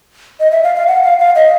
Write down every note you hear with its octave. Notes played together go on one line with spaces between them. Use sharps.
D#5
E5
F5
F5
F#5
F5
F5
D#5